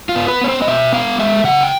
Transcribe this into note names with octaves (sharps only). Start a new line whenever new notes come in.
F4
B3
B4
B3 C#5
C5
D#5
B2 E5
B3 F5
G#3 E5
C#3 F#5
G5